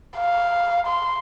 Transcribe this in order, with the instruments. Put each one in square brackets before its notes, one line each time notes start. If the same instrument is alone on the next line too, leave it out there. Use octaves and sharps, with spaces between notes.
[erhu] F5
C6